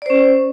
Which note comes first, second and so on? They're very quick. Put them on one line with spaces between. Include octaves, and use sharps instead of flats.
D5 C5 C#4